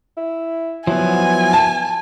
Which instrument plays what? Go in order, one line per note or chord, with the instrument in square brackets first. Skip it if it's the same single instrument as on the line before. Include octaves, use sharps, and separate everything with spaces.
[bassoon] E4
[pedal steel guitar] F3 F#3 B3 [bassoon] E4 [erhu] G#5
[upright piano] A5